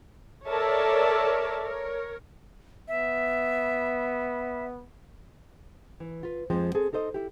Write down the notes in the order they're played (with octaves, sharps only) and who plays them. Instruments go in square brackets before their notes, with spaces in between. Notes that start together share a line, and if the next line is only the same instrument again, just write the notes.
[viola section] A4 A#4 C#5 D5 E5 A5
A#4 C#5
[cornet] B3 [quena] E5
[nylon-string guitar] E3
F4 B4
F2 F3 G#3 C4
C4 G#4 A4
D#4 A4 C5 D#5
E4 G4